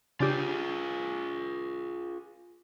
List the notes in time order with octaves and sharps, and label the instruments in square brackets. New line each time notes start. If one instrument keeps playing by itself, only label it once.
[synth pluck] C#3 D4 G4 [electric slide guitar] F4 G#4